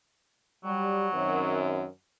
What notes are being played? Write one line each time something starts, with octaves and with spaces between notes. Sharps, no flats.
F#3 G3
F#2 D#3 C4